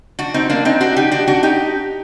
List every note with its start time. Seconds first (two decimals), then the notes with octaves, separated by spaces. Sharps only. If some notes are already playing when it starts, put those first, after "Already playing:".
0.19 D4 F#4
0.34 C4 D#4
0.50 A#3 D4
0.65 C4 D#4
0.81 D4 F#4
0.96 D#4 G4
1.11 D4 F#4
1.28 D4 F#4
1.43 D#4 G4